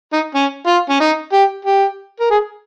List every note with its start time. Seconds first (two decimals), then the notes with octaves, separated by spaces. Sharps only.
0.13 D#4
0.35 C#4
0.67 F4
0.89 C#4
1.00 D#4
1.33 G4
1.65 G4
2.20 A#4
2.30 G#4